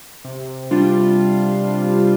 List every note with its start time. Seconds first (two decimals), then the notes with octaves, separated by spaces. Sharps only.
0.25 C3
0.71 G3 D4 F4